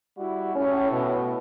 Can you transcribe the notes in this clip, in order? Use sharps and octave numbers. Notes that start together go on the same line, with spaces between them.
G3 E4 F#4
A2 C#4
B2